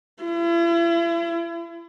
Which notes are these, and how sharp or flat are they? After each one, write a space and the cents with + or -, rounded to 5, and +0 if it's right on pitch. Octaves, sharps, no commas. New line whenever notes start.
E4 +40